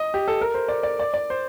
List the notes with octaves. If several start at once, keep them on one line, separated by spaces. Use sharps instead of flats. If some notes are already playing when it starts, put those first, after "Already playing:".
Already playing: D#5
G4
A4
A#4
C5
D5
D5
D5
D5
C5